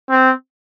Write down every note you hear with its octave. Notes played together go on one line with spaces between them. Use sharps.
C4